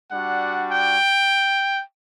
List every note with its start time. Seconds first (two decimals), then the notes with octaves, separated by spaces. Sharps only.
0.12 G3 D4 F#4 F#5
0.72 G5